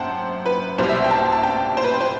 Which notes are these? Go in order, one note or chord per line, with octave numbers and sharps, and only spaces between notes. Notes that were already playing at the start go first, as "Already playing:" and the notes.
Already playing: F#2 C5 F#5 G5 A5
B4
C2 B2 G3 C5
E5
G5
A5
A5
G5
C5
B4
C5